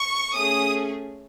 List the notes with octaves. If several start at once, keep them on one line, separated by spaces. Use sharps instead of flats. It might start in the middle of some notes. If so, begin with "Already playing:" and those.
Already playing: C#6
A3 C#4 G#4 D#6